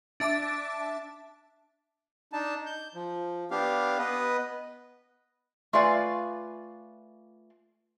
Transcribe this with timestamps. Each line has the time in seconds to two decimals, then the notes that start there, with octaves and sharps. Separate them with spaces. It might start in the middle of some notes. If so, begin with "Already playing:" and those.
0.20 D4 E5 A5 D6
2.33 D4 D#4 A5
2.66 G6
2.95 F3
3.51 B3 D4 G4 F5
3.99 B3 B4 D#5
5.73 A3 F4 B4 D5 F5 G#5